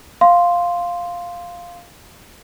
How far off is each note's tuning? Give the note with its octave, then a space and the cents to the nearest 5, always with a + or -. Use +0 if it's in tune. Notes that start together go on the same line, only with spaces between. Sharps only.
F5 +0 C6 +0